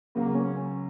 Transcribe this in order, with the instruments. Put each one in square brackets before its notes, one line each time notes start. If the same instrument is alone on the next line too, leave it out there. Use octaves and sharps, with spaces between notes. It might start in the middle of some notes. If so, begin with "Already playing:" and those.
[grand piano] C#2 C#3 F#3 [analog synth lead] A#3
[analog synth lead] C#4